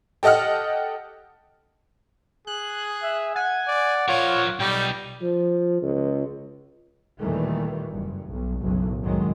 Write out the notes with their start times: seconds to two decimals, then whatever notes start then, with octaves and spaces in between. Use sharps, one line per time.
0.23 G4 A4 D#5 F#5 F6
2.47 G#4 F#6
3.03 E5
3.36 F#5 G#5
3.67 D5
4.08 F3 F4 A#4 C#5
4.60 B1 G3 D#4 G5
5.21 F3
5.82 C#2
7.21 D#2 A#2 D#3 E3 G3 A3
7.89 F#1 G2
8.29 B1
8.61 F#1 B1 A2 F#3
9.01 C2 F#2 A2 D#3 F#3 G#3